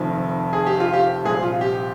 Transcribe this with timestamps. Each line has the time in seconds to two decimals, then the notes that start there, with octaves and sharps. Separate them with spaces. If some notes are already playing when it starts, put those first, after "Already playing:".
Already playing: F1 F2 D#3
0.53 G#4
0.66 G4
0.80 F4
0.94 G4
1.24 C2 A#2 F3 G#4
1.42 F4
1.61 G4